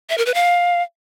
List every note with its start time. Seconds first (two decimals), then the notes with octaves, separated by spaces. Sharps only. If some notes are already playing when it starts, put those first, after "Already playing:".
0.09 E5
0.18 A#4
0.26 B4
0.34 F5